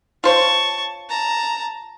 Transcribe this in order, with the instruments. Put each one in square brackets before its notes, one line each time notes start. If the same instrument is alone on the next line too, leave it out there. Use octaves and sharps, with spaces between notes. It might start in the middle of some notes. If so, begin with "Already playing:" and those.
[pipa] F4 C5 C#5 [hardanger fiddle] A5 C#6
[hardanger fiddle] A5 A#5